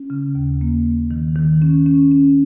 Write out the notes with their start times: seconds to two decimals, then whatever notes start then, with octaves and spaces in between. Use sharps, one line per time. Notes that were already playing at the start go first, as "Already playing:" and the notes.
Already playing: C#4
0.10 C#3
0.35 D#2
0.61 A#3
0.86 A#3
1.11 D#3
1.36 D#3
1.62 C#4
1.86 C#4
2.11 C#4